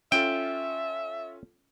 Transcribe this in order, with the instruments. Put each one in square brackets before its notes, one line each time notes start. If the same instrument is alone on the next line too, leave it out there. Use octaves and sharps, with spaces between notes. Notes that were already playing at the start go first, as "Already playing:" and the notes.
[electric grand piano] C#4 F4 A4 [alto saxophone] E5 [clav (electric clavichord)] G5